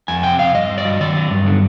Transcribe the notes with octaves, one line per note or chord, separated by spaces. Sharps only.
F2 G#5
C3 G5
F2 F5
G2 D#5
G2
D5
F#3
D#3 D5
F#3
G2
D3